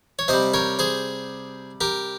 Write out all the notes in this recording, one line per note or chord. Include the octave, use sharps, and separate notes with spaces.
C#5
C3 G3 C5 D#5
A#4 C#5
G#4 C5
G4 A#4